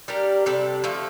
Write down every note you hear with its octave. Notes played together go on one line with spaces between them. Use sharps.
G3 D4 G4 A#4
C3 G3 D4 A4
D3 F3 A3